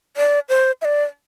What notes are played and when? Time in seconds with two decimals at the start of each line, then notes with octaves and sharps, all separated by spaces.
0.17 D5
0.49 C5
0.82 E5
0.85 D5